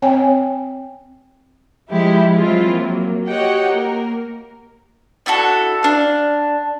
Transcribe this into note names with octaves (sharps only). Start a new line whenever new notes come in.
C4 C#5 G5 G#5
F3 G#3 E4 G4
F3 F#3 G#3 C4 E4 F4
F#3 A#3
F#4 G4 C#5 D#5 F#5 G5
A#3 A#4
D4 E4 F#4 A4
D4 F5